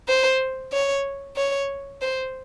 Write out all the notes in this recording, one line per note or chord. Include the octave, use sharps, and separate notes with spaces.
C5
C#5
C#5
C5